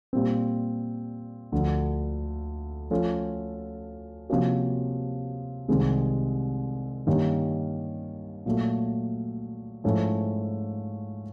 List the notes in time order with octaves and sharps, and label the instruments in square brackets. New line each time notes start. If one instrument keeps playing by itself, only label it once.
[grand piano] A#2 G3 C4
D2 D3 F3
F3 A3 C#4 F4 A4
C3 F3 A#3 C#4 F#4
C2 C3 D#3 G#3 C4
G2 D#3 G3 A#3 C#4
A#2 F#3 A3
G#2 F3 A3 C#4 E4